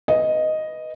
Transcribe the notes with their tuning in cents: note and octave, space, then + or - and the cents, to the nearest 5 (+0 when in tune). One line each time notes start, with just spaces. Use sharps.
B4 +0 D#5 +0